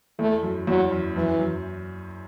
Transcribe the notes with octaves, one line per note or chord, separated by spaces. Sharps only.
E2 A3
F#2
E2 F#3
F#2
F#2 E3
F#2